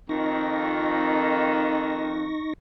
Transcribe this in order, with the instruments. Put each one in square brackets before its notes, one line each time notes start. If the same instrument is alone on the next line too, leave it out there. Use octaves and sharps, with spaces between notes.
[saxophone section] F2 D#3 [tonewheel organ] D#4 C#6 A#6